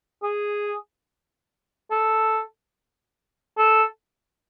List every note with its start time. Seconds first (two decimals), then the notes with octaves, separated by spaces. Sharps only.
0.23 G#4
1.91 A4
3.58 A4